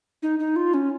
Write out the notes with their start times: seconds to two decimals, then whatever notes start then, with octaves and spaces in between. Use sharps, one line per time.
0.23 D#4
0.39 D#4
0.56 F4
0.74 C#4